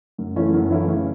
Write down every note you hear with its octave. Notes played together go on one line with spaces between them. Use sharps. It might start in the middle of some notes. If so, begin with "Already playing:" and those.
F#2
E3 A3 C#4 E4
F#2
E3 A3 C#4 E4
C#3